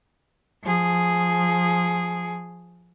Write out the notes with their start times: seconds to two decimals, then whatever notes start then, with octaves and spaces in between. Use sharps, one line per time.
0.63 F3 G#4